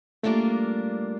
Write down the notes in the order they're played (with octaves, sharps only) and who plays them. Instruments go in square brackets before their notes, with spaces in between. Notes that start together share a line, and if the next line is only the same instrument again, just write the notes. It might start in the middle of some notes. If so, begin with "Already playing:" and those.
[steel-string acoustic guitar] G3 A#3 D4 F4 A#4 [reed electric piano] A3